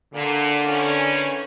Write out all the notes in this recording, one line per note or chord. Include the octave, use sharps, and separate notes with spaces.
A#2 D3
D#3 E3 C#4